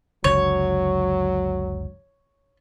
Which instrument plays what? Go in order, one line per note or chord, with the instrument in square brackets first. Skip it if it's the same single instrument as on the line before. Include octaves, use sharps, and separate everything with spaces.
[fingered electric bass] F#1 C#2 D3 [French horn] F#3 [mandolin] C#5